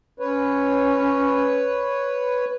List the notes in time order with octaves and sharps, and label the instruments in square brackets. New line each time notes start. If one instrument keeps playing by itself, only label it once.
[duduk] C#4 [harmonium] B4 C#5